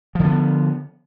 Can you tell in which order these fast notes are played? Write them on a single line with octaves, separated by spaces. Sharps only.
F3 D3 B3